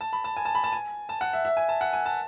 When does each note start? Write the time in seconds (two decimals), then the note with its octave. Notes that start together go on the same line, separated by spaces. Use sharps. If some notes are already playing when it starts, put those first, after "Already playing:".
0.01 A5
0.13 B5
0.24 A5
0.37 G#5
0.45 A5
0.55 B5
0.64 A5
0.72 G#5
1.09 A5
1.21 F#5
1.33 E5
1.45 E5
1.57 G#5
1.69 A5
1.81 F#5
1.93 G#5
2.06 A5